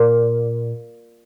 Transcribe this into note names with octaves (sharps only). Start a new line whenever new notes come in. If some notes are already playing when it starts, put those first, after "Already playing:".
Already playing: A#2